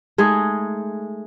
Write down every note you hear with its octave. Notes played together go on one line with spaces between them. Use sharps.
G#3 A3 D#4 G#4